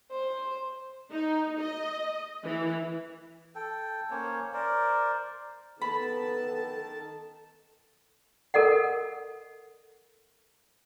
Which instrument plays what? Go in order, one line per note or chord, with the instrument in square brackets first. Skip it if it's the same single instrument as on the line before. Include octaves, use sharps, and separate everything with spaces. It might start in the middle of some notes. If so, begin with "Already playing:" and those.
[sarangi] C5
[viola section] D#4
D#5
E3
[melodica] A4 G5
A#3 C#4 C5 C#5
A#4 C5 D5
[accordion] D#3 A5 [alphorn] B3 [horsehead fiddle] A4 [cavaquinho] B5
[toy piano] A4 A#4 D#5 F#5